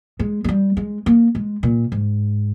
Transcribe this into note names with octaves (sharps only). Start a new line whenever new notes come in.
G#3
G#3
G3
G#3
A#3
G#3
A#2
G#2